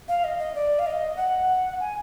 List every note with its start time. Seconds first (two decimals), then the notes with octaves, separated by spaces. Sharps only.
0.08 F5
0.24 D#5
0.39 D#5
0.55 D5
0.79 F5
0.86 D#5
1.17 F#5
1.80 G#5